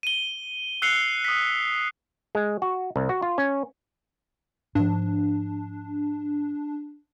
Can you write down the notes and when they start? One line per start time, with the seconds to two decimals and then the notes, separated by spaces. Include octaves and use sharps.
0.03 D#7 G7
0.82 E6 F#6 C7 C#7 F7 G7
1.25 D#6 B6
2.35 G#3
2.62 F#4
2.96 C2
3.09 F#4
3.22 F4
3.38 C#4
4.75 G#2 F3 D4